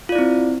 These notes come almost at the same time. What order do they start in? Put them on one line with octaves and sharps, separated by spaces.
F4 D5 E4 C4